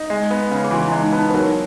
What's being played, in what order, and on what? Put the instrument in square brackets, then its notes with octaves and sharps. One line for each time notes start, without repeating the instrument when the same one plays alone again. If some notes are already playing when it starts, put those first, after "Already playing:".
Already playing: [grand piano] D#4
G#3
B3
C#3
[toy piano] G#4
[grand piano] E3 [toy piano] F#4
[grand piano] G#3 [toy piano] E4
[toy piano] D#4
[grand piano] B3
[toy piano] D#4
B4
[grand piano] F#3 [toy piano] A#4